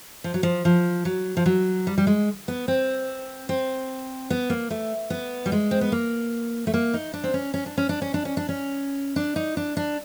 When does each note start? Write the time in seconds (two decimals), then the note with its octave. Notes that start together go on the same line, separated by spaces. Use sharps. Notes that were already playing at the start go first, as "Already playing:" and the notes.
0.24 F3
0.34 F#3
0.43 F3
0.65 F3
1.05 F#3
1.37 F3
1.46 F#3
1.87 G3
1.98 G3
2.07 G#3
2.48 B3
2.68 C4
3.49 C4
4.30 B3
4.50 A#3
4.70 A3
5.10 B3
5.46 G3
5.52 G#3
5.71 C4
5.81 B3
5.92 A#3
6.67 A3
6.74 A#3
6.94 D#4
7.13 D4
7.24 C4
7.34 C#4
7.54 C#4
7.66 D4
7.77 C#4
7.89 D4
8.02 C#4
8.14 D4
8.25 C#4
8.37 D4
8.49 C#4
9.16 D4
9.36 D#4
9.57 D4
9.77 D4